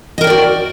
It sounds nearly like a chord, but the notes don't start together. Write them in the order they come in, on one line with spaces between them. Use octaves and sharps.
D#5 A#4 G5 D5 F#4